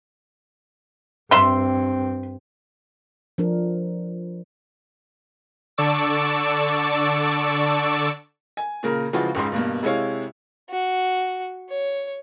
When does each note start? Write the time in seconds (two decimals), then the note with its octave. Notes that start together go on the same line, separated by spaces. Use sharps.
1.31 G2 C4 E5 C6
3.38 F3 D4 A#4
5.78 D3 D5 A5 C#6 D6 E6
8.57 G#5
8.83 A#2 C#3 A#4
9.13 C#3 E3 F3 G#3 F4 F#4
9.35 C#2 G#2 C#3 C6
9.52 G2 B2 A#3
9.83 C3 G#3 E4 C#5 F5
10.70 F#4
11.69 C#5